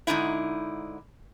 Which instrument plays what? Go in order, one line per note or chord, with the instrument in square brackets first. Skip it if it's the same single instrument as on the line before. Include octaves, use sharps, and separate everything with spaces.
[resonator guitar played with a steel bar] G#2 B2 D3 D#4 E4